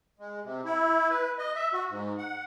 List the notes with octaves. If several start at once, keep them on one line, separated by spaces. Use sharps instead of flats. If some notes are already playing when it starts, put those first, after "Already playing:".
G#3
C3
E4
B4
D#5
E5
F#4
G#2
F#5